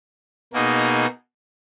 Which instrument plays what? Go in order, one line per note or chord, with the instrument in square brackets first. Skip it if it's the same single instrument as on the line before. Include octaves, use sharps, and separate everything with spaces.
[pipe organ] B2 A#3 D#4 G#4